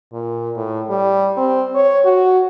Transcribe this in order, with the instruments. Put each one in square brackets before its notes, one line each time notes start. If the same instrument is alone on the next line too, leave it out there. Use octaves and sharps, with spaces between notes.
[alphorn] A#2
A2
G3
C4
C#5
F#4